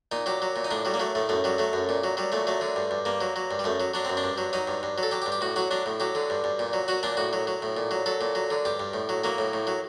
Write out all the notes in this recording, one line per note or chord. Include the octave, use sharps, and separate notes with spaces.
A#2 D#4
F#3 G4
F#3
A#2
D#4
A2 D4
F#3 G3
A#3
F#3 A3
A2 A3
F#2 A3
F#3 G3
F#3 A3
F#2
A#2
F#3
F#3 G3
A#2 A3
F#3 A3
D3
G2
G2
G2 A#3
F#3
F#3
G2
G3
F#2 A3
F#3
F#3 D4
F#2 C4
D4
G2
F#3
F#3 D#4
G2
G2
F#3
A4
F#3 G4
G4
G2
G4
A2 F#4
F#3 F#4
F#3 D4
A2
F#3 G4
D3
G2
G2
A#2
F#3
F#3 F#4
A#2 D4
A2 F#4
F#3
F#3
A2
A#2
F#3
F#3 A4
A#2
F#3
D3
G2 G4
G2
A2
F#3
F#3 A#3
A2
A2
F#3